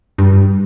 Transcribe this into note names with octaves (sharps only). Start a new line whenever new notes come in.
G2